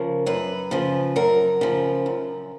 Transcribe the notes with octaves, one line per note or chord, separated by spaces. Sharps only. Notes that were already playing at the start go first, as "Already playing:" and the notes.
Already playing: C#3 F3 A#4
F#2 B4
C#3 F3
F#2 A#4
C#3 F3
F#2